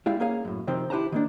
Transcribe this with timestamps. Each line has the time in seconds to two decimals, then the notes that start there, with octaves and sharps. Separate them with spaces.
0.06 G3 G#3 E4 F5
0.20 A#3 C#4 G#4 F5
0.45 F#2 A2
0.67 C3 D#3 F3 C4
0.90 E4 G4 B4 C5 A5 A#5
1.12 D#3 A#3 D4